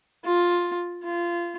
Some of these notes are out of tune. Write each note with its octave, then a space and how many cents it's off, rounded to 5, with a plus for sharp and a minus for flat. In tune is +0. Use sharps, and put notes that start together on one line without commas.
F4 +5
F4 -20